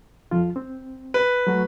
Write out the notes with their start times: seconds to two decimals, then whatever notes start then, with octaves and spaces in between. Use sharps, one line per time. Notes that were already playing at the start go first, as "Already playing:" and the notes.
0.31 F2 F3 F4
0.56 C4
1.14 B4
1.47 F#3 A3 F#4